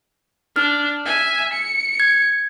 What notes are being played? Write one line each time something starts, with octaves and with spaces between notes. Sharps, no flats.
D4 F6
E5 G#5
C#7
G#6